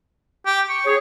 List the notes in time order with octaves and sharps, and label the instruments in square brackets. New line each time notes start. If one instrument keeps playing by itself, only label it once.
[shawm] G4
C#6
[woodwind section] G#4 C#5